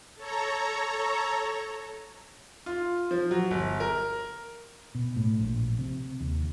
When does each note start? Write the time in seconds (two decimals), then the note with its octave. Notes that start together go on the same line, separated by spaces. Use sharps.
0.15 A4 C#5 A#5
2.66 F4
3.11 F3
3.31 F#3
3.51 G1
3.80 A#4
4.95 B2
5.16 A2
5.40 A#1
5.79 C3
6.21 D#2